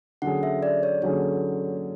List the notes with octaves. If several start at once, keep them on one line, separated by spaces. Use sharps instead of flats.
D3 F#3 C#4 G#4 F#5
E5
D5
C#5
D3 F#3 C#4 G#4 C#5